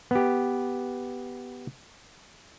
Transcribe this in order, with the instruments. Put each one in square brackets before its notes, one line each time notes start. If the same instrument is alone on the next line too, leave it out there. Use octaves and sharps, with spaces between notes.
[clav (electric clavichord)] B3 G4